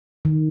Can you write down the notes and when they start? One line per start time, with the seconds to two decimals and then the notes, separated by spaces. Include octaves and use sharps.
0.25 D#3